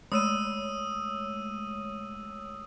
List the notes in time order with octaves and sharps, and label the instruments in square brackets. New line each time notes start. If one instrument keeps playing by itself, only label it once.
[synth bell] G#3 A3 C#5 [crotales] D#6 E6 D#7